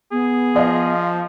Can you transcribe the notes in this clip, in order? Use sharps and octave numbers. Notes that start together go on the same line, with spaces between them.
B3 G#4
F3 D#5 F5